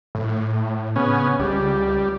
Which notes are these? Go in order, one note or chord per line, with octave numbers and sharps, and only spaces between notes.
A2
C#3 B3 C#4
C#2 G3